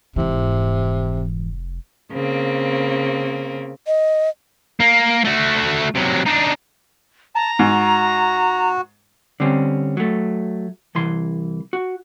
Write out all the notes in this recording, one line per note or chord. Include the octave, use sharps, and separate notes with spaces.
F1 G#2 C3 E3
C#3 A#3 C4
D#5
A#3
A3 F#4
C3 F#3
D4 D#4
A5 A#5
G#2 F#4
D3 G3 C4 C#4
F#3 A3
C2 E3 C6
F#4